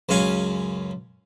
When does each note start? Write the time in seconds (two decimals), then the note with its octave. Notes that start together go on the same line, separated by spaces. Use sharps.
0.09 C#2 F#2 C#4 F5 G#5 C#6